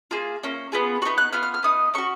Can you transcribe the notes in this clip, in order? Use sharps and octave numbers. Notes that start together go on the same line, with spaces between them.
A#3 F4 G#4
A#3 C#4
B3 F4 G#4
B3 D#4 F#4 C#6
F#6
B3 F4 F6
F6
F6
B3 D#4 D#6
C#4 F#4 C#6